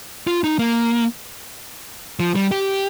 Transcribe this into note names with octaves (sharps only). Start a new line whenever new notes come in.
F4
D#4
A#3
F3
G3
G4